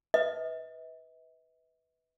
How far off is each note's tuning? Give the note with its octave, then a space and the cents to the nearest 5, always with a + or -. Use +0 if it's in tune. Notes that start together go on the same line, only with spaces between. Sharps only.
B4 +0 E5 -45